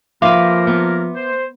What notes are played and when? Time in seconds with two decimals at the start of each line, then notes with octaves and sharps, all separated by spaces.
0.22 F3 A#3 A#4 B4 E5 F5 C6 D6
0.67 B3
1.14 C5